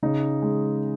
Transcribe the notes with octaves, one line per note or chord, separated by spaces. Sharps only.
C#3 D#4
G#3